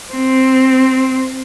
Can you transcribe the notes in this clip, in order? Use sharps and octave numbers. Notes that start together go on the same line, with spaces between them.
C4